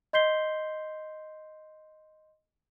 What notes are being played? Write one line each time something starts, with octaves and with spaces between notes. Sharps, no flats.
D#5 C6 G6 B6 C7 G7